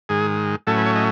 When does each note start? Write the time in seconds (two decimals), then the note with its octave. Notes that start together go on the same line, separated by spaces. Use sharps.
0.09 G#2 D#3 G#3 G#4
0.67 A2 F#3 A3 C#4 A4
0.77 B4
0.86 C#5
0.96 D#5